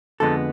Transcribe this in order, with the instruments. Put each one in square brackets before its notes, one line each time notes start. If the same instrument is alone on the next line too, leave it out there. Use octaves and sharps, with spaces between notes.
[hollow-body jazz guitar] F2 D3 F3 G#3 B3 A4